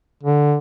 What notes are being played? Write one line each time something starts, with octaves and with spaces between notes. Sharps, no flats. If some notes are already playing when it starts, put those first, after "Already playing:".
D3